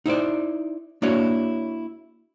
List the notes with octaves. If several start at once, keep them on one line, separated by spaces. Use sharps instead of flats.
D#4 E4 C5 D5
A#3 D4 E4 F#4 C#5 D5